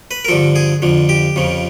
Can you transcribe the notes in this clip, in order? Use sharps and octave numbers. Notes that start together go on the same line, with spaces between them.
B4
A#4
G2 D3 F3 A4
G#4
F2 D3 F3
G4
F2 C#3 F3